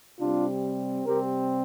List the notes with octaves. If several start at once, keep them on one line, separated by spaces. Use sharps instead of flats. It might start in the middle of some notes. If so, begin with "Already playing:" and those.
C3 G3 C4 D4 F4
C3 G3 C4 G4 A#4